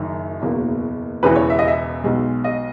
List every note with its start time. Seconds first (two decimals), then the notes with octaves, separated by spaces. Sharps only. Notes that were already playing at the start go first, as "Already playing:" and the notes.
Already playing: F#1 F#2 D#3
0.42 F#1 E2 B2 A#3
1.23 E1 E2 C#3 E3 B4
1.36 C#5
1.50 E5
1.59 D#5
1.68 E5
2.04 B1 B2 G#3
2.44 D#5